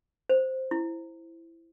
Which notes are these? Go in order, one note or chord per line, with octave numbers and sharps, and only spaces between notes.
C5
E4